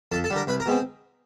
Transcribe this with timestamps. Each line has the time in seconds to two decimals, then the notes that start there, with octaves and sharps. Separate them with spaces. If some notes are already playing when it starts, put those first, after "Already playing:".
0.12 F2 A4 A5
0.24 A4 A5
0.30 D3 G3
0.36 A#4 A#5
0.47 C2 B4 B5
0.60 A#4 A#5
0.66 B2 G#3 C4